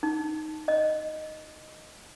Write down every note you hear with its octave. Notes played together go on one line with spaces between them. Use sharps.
D#4
D#5